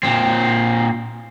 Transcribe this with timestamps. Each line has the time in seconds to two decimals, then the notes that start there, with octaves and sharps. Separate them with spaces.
0.03 A#2 C4